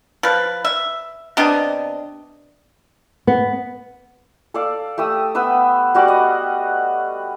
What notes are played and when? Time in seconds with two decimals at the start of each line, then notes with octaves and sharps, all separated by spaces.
0.23 F3 B4
0.65 E5
1.37 C3 B3 D4 D#5
3.27 B3
4.54 A4 D5 F5
4.98 A3 G4 D#6 E6
5.35 B3 B4 D#6 E6
5.95 G3 F#4 D5
6.08 D#5